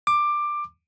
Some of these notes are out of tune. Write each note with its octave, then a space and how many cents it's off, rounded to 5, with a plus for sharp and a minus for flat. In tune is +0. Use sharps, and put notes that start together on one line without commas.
D6 +15